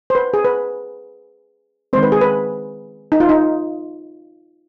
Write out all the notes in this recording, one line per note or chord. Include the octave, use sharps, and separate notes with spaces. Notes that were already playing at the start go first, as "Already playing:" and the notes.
C5
B4
G#4
B4
D#3 G#3 C4 C5
B4
G#4
B4
D#4
F4
D#4